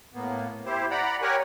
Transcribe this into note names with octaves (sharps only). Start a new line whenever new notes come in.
A2 A#3 B3
E4 G4 C5
D5 F#5 A#5 B5
G4 A#4 C#5 F#5 G#5